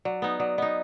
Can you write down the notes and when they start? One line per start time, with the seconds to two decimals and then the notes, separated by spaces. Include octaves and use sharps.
0.05 F#3 D5
0.22 B3 D#4
0.40 F#3 D5
0.58 B3 D#4 D#5